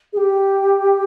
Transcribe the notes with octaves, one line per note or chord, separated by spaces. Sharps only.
G#4
G4